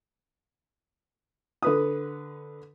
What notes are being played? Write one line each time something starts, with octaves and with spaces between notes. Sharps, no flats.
D3 B4 D#6